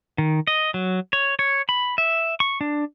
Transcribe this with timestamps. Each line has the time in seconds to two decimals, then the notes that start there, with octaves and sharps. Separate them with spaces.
0.18 D#3
0.47 D#5
0.74 F#3
1.13 C#5
1.39 C#5
1.69 B5
1.98 E5
2.40 C#6
2.61 D4